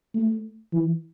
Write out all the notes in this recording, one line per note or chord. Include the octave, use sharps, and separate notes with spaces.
A3
E3